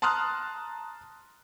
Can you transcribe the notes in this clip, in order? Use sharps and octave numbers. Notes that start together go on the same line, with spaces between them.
A5 A#5 C6 D#6 F6 F#6